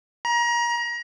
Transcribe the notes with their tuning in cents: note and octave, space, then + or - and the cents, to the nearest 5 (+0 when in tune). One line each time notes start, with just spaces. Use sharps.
A#5 +30